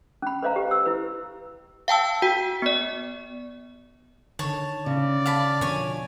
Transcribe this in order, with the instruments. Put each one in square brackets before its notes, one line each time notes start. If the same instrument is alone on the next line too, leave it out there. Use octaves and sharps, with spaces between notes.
[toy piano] C#4 B5
B4 C5 D#5 F5 A#5
G4 B4
E6
E4 B4
[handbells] F5 G5 A5 E6
F#4 G5
B3 D5
[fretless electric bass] D3 D#3 [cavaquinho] C#5 A5
[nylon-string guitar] C#3 [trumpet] D5
[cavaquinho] F5 A5 B5
[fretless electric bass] B2 D3 F3 [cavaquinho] C#5 G#5